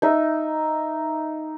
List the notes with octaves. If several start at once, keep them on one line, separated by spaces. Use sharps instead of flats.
D#4 E5